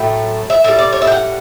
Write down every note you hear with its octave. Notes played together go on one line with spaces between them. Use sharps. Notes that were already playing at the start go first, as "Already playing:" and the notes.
Already playing: A2 F#3 A3 G5
E5
A2 G3 E5
D5
C#5
E5
G5
F#5